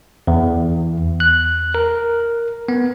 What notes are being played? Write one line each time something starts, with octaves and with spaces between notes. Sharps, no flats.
E2
F#6
A#4
B3